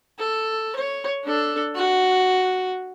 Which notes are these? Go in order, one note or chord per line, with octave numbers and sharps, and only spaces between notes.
A4
C#5
D4 A4
F#4